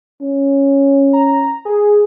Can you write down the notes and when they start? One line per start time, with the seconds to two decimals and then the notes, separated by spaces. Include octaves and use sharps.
0.21 C#4
1.13 A#5
1.65 G#4